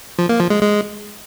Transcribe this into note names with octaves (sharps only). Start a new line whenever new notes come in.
F3
A#3
F3
G#3
G#3